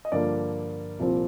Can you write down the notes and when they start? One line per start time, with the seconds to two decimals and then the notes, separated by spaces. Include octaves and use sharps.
0.05 D#5
0.12 G2 D3 F3 A#3 D5
0.99 C2 A#2 F3 C4